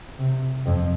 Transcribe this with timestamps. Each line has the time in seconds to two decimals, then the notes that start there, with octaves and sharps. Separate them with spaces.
0.19 C3
0.66 F2